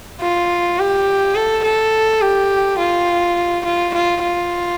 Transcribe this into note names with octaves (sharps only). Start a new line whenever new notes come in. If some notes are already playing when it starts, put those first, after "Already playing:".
F4
G4
A4
A4
G4
F4
F4
F4
F4